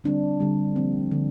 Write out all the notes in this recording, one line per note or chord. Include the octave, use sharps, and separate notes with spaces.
D3 G3 C4 D4
D3 G3 C4
D3 F3 A#3 C4
D3 F3 A#3